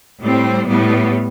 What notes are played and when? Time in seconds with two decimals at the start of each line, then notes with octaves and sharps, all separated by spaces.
0.21 A2 G3 C4
0.66 A2 G3 B3